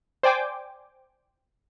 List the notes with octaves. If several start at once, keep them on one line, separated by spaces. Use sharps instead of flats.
C5 D5 G5 G#5 D6